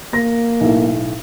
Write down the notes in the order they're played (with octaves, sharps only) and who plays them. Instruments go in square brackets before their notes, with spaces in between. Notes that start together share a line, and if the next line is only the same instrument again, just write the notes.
[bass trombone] A#3 [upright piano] A#6
[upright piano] B1 A2